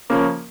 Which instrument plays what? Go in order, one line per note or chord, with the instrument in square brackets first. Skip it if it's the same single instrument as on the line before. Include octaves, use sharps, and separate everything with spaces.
[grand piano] C#3 F3 A#3 C#4